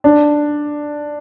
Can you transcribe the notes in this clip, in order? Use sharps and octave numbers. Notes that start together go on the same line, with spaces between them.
D4